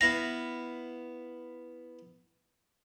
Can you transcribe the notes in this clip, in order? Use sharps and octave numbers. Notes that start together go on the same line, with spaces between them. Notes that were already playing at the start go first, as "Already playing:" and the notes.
B3 E4 F5 A#6